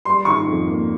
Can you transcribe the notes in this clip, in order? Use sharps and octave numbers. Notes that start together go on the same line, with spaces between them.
G3 C6
D#3 C#6
F2
A#3